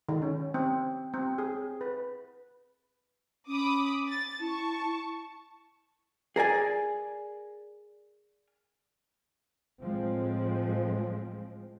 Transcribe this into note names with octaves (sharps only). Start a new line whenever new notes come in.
D#3
C#4
C4
C4
G#4
B4
C#4 B5 D6 D#6
A6
E4 A5 C#6
G#4 A#4 D5 G#5
A2 F3 G#3 C4